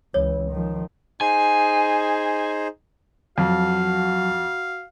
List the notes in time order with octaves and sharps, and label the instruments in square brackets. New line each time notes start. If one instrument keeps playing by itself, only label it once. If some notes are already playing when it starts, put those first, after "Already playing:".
[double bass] C#2 E3 [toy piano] C#5
[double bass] D#3 F3
[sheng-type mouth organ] D#4 G#4 C5 [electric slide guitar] G#5
[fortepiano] F2 [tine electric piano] F#3 A5 [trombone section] F#4 [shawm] F5